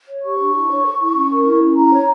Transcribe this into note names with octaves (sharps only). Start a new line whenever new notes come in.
C#5
G4 C#6
D4
E4
C#5
A4
E4
C#4
A#4
E4
C#4
E4 A#5
C#5